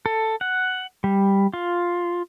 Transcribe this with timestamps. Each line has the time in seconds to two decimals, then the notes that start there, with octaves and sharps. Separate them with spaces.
0.06 A4
0.41 F#5
1.04 G3
1.54 F4